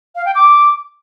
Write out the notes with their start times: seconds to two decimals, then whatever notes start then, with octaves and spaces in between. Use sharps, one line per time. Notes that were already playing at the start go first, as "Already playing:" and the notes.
0.15 F5
0.25 G5
0.35 D6